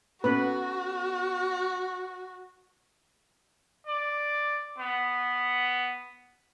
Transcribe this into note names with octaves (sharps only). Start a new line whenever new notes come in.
B3 C#4 F#4 A4 B4
D5
B3